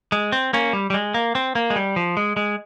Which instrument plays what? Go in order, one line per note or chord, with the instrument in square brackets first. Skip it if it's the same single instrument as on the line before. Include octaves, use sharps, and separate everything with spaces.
[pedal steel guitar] G#3
C4
A#3 C#4
G3
G3
G#3
A#3
C4
A#3
G#3
G3
F3
G#3
G#3